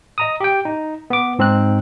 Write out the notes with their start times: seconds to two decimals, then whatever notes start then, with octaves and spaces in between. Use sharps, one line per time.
0.18 D#5 A#5 D#6
0.40 G4 G5
0.65 D#4
1.10 B3 D6
1.39 G#2 C4 D#4 F#6